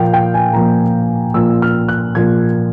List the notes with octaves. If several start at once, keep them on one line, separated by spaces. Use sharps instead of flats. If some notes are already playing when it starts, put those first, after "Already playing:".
Already playing: A#2 F3 A#3 F5 G5
G5
G#5
A#2 F3 A#3 A#5
A#2 F3 A#3 E6
F6
F#6
A#2 F3 A#3 G#6